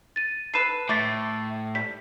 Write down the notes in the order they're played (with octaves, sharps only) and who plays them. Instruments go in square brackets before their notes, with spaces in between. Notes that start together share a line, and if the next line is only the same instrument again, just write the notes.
[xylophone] A6 D#7
[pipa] A4 B4 [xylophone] C7 D#7 E7
[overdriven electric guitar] A2 [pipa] A3 [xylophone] D6 A6 B6
[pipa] G3 [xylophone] B6